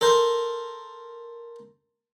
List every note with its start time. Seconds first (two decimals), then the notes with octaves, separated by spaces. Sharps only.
0.01 A4 A#4 C5